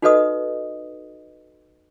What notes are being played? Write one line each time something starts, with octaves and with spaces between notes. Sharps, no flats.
D#4 F#4 A4 B4 D#5 D#6